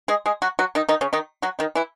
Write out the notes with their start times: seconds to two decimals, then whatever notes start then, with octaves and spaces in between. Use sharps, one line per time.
0.08 G#3 G#4
0.26 G#3 G#4
0.42 F#3 F#4
0.59 F#3 F#4
0.75 D#3 D#4
0.89 D#3 D#4
1.01 C#3 C#4
1.13 D#3 D#4
1.42 F#3 F#4
1.59 D#3 D#4
1.75 E3 E4